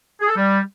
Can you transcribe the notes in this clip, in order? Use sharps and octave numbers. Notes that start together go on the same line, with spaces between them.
G#4
A4
G3